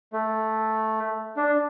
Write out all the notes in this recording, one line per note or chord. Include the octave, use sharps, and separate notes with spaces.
A3
D4